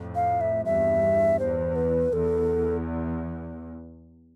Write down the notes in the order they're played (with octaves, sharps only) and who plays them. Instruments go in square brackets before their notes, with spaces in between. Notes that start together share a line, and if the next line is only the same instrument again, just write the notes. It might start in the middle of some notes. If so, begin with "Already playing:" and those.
Already playing: [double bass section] F2 A2
[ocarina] F5
E5
[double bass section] E2 G2 [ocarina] E5
[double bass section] E2 [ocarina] C5
[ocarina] B4
[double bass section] E2 [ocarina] A4